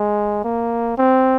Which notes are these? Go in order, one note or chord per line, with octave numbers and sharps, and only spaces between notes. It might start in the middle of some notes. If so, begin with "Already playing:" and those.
Already playing: G#3
A#3
C4